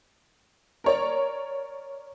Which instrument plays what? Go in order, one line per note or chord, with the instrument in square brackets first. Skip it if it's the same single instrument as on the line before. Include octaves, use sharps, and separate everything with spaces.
[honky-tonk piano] A#4 C#5 D5